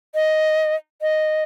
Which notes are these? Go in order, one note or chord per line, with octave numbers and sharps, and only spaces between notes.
D#5
D#5